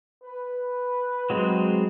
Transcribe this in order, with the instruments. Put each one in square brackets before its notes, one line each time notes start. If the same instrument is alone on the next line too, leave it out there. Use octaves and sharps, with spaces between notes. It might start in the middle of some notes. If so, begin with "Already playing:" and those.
[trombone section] B4
[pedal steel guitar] F#3 G#3 C4